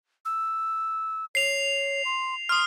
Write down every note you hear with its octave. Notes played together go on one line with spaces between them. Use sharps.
E6
C#5 C7 F7
C6
C6 D#6 F6